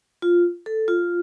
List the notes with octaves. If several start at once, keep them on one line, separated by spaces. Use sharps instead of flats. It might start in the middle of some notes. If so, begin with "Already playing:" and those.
F4
A4
F4